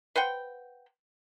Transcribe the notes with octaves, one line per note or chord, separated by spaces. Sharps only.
B4 C5 F#5 G5